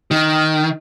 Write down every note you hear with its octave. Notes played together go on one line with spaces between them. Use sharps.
D#3